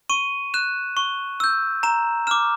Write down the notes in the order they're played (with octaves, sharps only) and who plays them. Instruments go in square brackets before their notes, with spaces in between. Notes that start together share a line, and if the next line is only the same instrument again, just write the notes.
[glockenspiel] C#6 D#7
F#6 E7
C#6
E6 G6
A#5 E7
D6 F6 E7